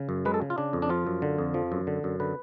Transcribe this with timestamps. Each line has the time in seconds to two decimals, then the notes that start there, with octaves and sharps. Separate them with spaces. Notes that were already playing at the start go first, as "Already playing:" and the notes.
Already playing: C#3
0.09 F#2
0.25 G#3 B4
0.34 A4
0.42 C#3
0.50 F4
0.58 C#3 D4
0.73 F2
0.82 D4
0.89 F3 F4
1.07 F#2
1.22 D3
1.38 F2
1.54 F3
1.72 F#2
1.87 D3
2.04 F#2
2.20 D3 B4